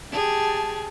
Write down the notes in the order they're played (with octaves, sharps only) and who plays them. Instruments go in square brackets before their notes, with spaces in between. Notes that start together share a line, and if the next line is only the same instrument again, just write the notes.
[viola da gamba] G4 G#4 [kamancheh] A5